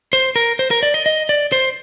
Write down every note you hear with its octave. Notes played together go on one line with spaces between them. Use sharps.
C5
A#4
C5
A#4
D5
D#5
D#5
D5
C5